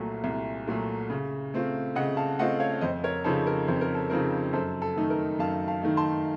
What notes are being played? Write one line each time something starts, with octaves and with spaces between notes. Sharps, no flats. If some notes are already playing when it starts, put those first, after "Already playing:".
Already playing: C2 A#2 F#3 A3
C2
A#2 F#3 A3
C#3
A3 C4 F4
C#3 D#5 F#5
F5 A5
A3 C4 F4 D#5 F#5
C#5 F5
F5
F2 C5 D#5
A#4 C#5
C#3 F3 C4 D#4 A4 C5
A#4
F2 C5
A#4
A4
C#3 F3 C4 D#4 A#4
F#2 A4 C5
A4
D#3 A3 D#4
A#4
F#2 F5 A5
F5 A5
D#3 A3 D#4
A5 C6